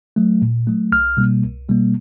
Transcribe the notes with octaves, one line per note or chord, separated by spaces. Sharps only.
F#3 A3
A#2
F#3 A3
C2 F6
B2 G3 A#3
C2
B2 G3 A#3